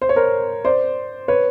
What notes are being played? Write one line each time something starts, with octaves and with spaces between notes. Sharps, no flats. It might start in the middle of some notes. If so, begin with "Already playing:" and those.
C5
C#5
A#4 C5
C5 D5
B4 C#5